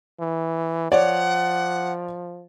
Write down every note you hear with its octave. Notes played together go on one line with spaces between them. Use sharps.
E3
F3 C#5 D5 F#5